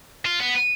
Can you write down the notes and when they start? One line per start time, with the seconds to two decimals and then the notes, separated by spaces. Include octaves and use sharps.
0.25 F4
0.39 B3